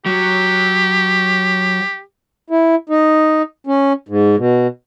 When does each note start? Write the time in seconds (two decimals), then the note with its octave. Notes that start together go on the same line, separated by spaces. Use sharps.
0.06 F#3 G4
2.50 E4
2.89 D#4
3.67 C#4
4.08 G#2
4.37 B2